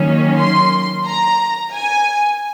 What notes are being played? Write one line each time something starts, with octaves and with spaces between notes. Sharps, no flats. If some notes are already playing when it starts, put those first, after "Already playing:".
Already playing: D#3 F#3 A#3 C#4
C6
A#5
G#5